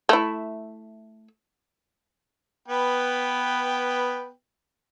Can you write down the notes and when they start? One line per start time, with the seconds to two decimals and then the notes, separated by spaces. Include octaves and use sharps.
0.09 A3 E4
2.68 B3 B4 G5